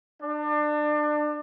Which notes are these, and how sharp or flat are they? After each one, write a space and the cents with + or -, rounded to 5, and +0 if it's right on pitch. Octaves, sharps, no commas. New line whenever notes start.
D4 +30